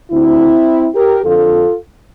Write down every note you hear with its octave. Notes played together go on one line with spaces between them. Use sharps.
D2 D3 C4 E4
G4 A#4
F2 D3 F4 A4